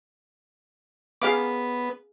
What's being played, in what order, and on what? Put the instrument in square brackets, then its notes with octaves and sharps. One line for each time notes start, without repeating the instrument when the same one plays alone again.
[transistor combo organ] B3 [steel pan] G#4 F5 D6